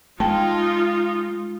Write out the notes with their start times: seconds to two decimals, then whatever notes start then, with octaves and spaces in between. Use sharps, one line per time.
0.20 G#3 D#4 F4 G5 A5